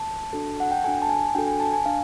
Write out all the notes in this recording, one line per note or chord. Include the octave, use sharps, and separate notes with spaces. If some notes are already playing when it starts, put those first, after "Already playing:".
Already playing: A5
D4 F#4 A4
F#5
G5
D4 F#4 A4 G#5
A5
G#5
D4 F#4 A4 G5
G#5
A5
G#5
D4 F5